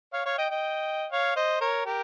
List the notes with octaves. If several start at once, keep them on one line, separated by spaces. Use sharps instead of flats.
C#5 F5
C#5 F5
D#5 G5
D#5 G5
C#5 F5
C5 D#5
A#4 C#5
G4 A#4